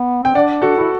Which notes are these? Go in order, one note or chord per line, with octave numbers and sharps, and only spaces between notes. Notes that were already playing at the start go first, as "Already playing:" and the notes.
Already playing: B3
C4 G5
D4 D5 F#5
D4 F#4 A4
E4 F#4